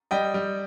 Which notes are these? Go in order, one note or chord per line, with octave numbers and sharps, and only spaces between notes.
G3 D#5 G5
G3